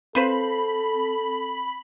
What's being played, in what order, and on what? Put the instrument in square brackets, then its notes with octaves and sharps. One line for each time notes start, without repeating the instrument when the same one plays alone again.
[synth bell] C4 [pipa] F4 B4 C5 [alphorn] A4 [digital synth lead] B5